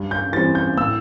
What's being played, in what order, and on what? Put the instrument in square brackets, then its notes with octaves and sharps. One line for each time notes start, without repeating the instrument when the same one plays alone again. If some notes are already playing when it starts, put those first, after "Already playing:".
Already playing: [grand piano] G2
G6
E3 G3 C4 A6
G6
A2 E6